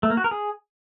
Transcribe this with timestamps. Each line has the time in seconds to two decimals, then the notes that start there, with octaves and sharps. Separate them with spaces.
0.03 A3
0.10 A#3
0.17 F#4
0.24 A#4
0.31 G#4